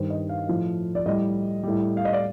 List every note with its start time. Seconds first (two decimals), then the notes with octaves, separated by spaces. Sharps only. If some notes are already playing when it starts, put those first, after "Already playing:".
Already playing: G2 D#3 G3 C5
0.10 D#5
0.29 F5
0.48 A2 F3
0.95 D5
1.06 A2 G3 D#5
1.63 A2 G3
1.97 F5
2.05 D#5
2.13 D5